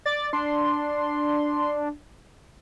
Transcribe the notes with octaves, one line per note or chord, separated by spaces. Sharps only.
D5 A6
D4 C6